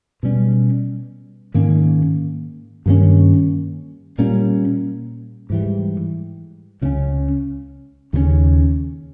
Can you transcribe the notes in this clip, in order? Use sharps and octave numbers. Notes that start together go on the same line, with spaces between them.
B2 G3 C#4
G#2 D#3 A#3 C#4
G2 D#3 A#3 C#4
A#2 G3 A#3 C#4
G#2 E3 G3
C#2 C#3 G#3 C#4
D#2 C#3 G3 C#4